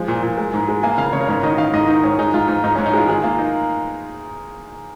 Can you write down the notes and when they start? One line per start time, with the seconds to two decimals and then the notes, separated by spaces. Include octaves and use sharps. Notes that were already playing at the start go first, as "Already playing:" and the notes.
Already playing: F3 G#3
0.08 A#2
0.23 A#2
0.38 G#3
0.54 G#2
0.68 G#3
0.83 A#3 G#5
0.98 C#3 F5
1.13 C#3 C#5
1.21 A#4
1.28 G#2 C#5
1.43 D#3 D#5
1.58 D#3 F5
1.74 G#2 D#5
1.88 D#3 D#4
2.04 G#2 C#4
2.18 G#3 D#4
2.34 G#2 F4
2.48 G#2 D#4
2.64 G#2 D#4
2.75 C#4
2.78 G#2
2.86 D#4
2.94 G#3 F4
3.08 D#3 G#4
3.23 A#3 F4
3.39 D#4